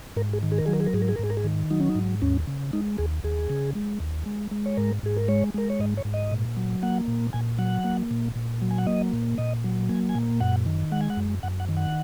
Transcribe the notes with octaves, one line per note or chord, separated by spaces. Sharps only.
G#2 A#4
G#4
D#3
G#4
A#4
F#3 G#4
A#4
G#4
A#4
G#2 G#4
A#4
G#4
A#4
G#2 G#4
A#4
G#4
D#3
F#3 D#4
C#4
D#4
G#2
D#2 C#4
C#3
G#3 D#4
D#2 G#4
D#2 G#4
C#3
G#3
D#2
G#3
G#3
C#5
G#2 A#4
G#2 G#4
A#4
G#3 C#5
G#3 A#4
C#5
G#2 D#5
C#5
G#2
D#5
A#2
F#3
A#3 F#5
A#2
A#2 G#5
F#3 F#5
A#3
A#2
A#2
F#3
G#5
F#5
A#3 D#5
A#2
A#2 D#5
F#3
A#3 G#5
G#5
A#2
F#2 F#5
D#3
G#3 F#5
G#5
F#5
F#2
F#2 F#5
F#5
D#3
F#5